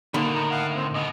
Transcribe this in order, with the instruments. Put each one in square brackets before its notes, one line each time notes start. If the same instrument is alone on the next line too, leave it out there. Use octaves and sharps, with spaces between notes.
[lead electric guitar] B2 G3 [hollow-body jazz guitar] D3 D#3 A#3
[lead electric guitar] A2 [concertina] A#5
[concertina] F5 F#5
C4
[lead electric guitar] F#2 B2 [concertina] D#5